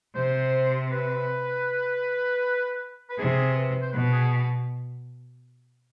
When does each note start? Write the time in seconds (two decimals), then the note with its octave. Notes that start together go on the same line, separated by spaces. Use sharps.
0.16 C3 C5
0.92 B4
3.10 B4
3.19 C3 G#4
3.55 B4
3.82 C5
3.93 B2 B4
4.12 G#4